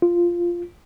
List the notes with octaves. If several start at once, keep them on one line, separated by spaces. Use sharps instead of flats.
F4